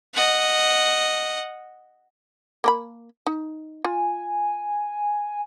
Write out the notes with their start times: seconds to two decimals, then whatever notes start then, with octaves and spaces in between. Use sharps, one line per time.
0.14 D#5 F#5
2.64 A#3 A#4 B5
3.26 D#4
3.84 F4 G#5